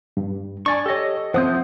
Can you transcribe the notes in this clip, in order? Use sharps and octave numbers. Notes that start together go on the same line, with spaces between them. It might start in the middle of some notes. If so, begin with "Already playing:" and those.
G2
D4 D5 G#5 C#6
G4 A4 C#5 D#5
F3 C4 C5 E5 F#5 D#6 G6